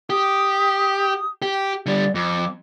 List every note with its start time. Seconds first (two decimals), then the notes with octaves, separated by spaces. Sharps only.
0.10 G4 D#6
1.42 G4
1.86 D3 G3 D5
2.15 F2 D6